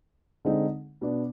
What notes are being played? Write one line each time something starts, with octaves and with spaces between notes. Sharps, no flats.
D3 G#3 C4 D#4
B2 B3 D4